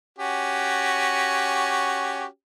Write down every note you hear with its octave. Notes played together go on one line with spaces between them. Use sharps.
C#4 F#4 G4